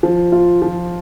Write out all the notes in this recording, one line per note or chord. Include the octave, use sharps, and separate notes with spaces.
F3
F4
F3